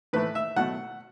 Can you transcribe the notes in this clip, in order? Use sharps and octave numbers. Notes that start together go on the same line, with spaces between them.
A2 E3 A3 B4
E5
B2 F#3 A3 F#5